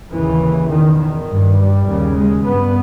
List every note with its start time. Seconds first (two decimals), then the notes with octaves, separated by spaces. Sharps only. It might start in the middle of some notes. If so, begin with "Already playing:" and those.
0.12 D#2 C#3 E3
0.70 E2 B2 D#3
0.99 D#3
1.28 G2
1.58 G3
1.86 D#2 C#3
2.16 G#3
2.45 G2 B3